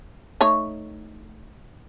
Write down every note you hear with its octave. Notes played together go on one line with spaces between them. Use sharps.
A3 D#4 C#5